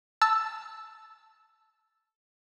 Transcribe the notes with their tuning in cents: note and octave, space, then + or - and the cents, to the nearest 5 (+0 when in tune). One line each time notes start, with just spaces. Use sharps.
A5 +0 E6 +0